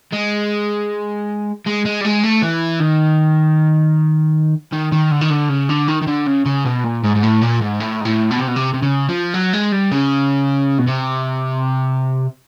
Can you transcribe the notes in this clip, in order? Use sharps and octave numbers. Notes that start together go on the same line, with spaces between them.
G#3
G#3
G#3
G3
G#3
A3
E3
D#3
D#3
D#3
D3
D#3
D3
C#3
D3
D#3
D#3
D3
C#3
C#3
B2
A#2
G#2
G#2
A2
A#2
G#2
A2
G#2
A2
B2
C3
B2
C3
C3
C#3
F3
F#3
G#3
G3
C#3
B2
C3